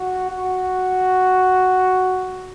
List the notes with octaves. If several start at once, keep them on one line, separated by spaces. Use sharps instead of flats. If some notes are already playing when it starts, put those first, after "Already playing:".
Already playing: F#4
F#4